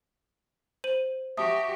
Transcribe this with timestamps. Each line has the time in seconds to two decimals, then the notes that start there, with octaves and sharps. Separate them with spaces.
0.84 C5 D#7 F#7
1.37 F#4 G4 E5 A5 D#6